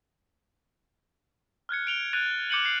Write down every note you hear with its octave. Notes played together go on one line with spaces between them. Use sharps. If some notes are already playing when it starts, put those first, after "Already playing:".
F6 F#6 G#6 C#7
D7 F7 G7
F#6 G#6 A6 D7 D#7 F7
D6 G6 C#7 D#7 F#7 G7
C7 F7